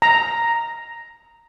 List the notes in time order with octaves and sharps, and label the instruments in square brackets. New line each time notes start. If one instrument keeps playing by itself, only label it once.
[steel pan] A#5